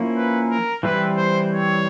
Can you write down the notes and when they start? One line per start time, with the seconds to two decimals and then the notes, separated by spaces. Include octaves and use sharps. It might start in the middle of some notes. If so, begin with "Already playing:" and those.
Already playing: F3 A#3 C#4 E4
0.17 B4
0.50 A#4
0.83 E3 G3 C4 E4 B4
1.17 C5
1.51 C#5